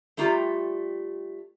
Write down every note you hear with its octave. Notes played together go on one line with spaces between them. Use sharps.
G3 A3 F4 G4 A#5